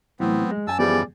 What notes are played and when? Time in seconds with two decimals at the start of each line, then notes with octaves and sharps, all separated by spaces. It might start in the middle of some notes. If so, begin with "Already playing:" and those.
0.20 A2 E3 F#3 A3 B3 C4
0.51 G#3
0.67 F#2 G#5 A5 E6
0.79 E3 F3 G3 B3 G4 G#4 D5